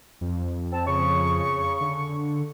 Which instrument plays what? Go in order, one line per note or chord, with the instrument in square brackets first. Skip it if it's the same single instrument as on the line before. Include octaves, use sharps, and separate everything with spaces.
[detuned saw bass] F2
[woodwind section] C4 A5
C#3 C#6
[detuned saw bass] D3